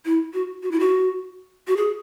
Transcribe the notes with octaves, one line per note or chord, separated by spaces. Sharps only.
E4
F#4
F#4
E4
F#4
F#4
G#4